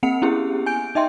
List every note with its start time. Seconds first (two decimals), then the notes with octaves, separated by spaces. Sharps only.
0.03 A#3 C4 F#5 C#7 F7
0.22 B3 C#4 E4 G4 G#4
0.66 G#5 G6 D7
0.95 D#4 D#5 E5 G5 C6